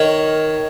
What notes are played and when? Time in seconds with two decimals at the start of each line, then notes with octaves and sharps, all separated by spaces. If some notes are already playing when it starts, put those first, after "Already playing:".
Already playing: D#3 A#4 C#5